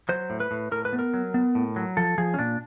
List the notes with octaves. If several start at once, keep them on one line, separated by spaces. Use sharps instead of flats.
F#3 C5
A2
B4
A2
A2 A#4
B4
B3
A#4
F#3
B3
A2
F#3
F3 A4
F3 G#4
C#4
A#2 D4